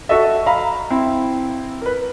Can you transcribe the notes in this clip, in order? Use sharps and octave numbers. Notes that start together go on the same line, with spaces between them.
F#4 A4 D#5 E5
F5 A#5 B5
C4 E4
A#4 B4